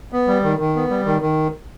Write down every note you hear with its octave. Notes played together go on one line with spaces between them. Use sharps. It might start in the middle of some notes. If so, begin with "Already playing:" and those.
B3
G3
D#3
D#3
B3
G3
D#3
D#3